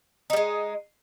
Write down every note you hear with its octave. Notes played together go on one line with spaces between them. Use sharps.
G3 G#3 D#4